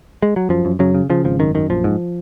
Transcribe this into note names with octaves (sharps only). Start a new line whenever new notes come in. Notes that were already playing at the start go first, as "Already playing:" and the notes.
G#3
F#3
F#2 F3
F#2
F#2 C#3 F#3
C#3
C#3 F3
G#1 F3
F#2 D#3
F#2 D#3
A#1 F3
G#2